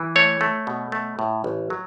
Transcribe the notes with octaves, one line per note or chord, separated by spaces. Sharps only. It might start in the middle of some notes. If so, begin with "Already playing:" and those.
Already playing: E3
A3 C#5
A3
B2
A3
A2
A1
F#3